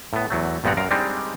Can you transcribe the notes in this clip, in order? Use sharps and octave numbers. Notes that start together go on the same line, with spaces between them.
A2 B3
E2 F#3 A3
A#1 G2 B3 C4 F#5 A#5
F#2 A#4 F5
G3 G#3 C4 D4 D#4